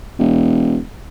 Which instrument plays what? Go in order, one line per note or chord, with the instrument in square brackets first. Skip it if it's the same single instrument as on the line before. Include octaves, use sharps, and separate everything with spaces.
[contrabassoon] E1